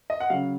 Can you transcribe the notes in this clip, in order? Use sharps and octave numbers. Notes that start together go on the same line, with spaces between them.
D#5
F#5
C#3 F#3 F5